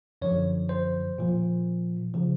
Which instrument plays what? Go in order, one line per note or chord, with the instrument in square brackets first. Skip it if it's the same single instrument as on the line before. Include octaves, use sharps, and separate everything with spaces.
[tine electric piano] F#2 D3 F3 C#5
C5
A#2 F3
C#3 F3